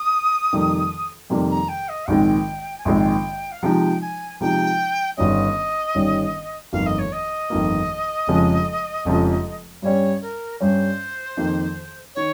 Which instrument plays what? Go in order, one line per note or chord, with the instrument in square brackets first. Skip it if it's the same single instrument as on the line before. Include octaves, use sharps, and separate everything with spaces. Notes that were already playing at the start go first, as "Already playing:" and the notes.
Already playing: [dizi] D#6
[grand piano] F2 C3 D#3 G3 A#3
F2 C3 D#3 G3 A#3
[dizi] A#5
G5
D#5
[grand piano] A#1 G#2 D#3 G#3 C4 [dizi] G5
[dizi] G#5
[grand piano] A#1 G#2 D#3 G#3 C4 [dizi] G5
[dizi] F5
[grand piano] C3 F3 G#3 D#4 [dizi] G5
[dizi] G#5
[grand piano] C3 F3 G#3 D#4 [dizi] G5
[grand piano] G1 G2 D#3 G3 C#4 [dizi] D#5
[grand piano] G1 G2 D#3 G3 C#4
[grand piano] G1 F2 D#3 A#3 [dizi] F5
[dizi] D#5
C#5
D#5
[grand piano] G1 F2 D#3 A#3
F1 F2 C#3 F3 G#3
F1 F2 C#3 F3 G#3
[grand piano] G2 G3 C#4 [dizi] C#5
[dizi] A#4
[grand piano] G2 G3 C#4 [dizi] C5
[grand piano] F2 D#3 A#3
[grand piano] D#3 [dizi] C#5